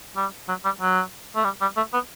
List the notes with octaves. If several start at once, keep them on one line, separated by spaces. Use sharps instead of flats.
G3
F#3
G3
F#3
A3
G3
G3
A3
B3